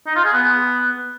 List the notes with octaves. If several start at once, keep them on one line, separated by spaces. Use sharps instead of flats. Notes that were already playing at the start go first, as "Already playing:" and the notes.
D#4
F4
G#4
B3